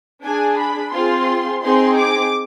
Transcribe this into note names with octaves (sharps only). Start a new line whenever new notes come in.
D4 G#4 G#5
B5
C4 F4 G#4 C6
C4 D#4 G#4 C6
D6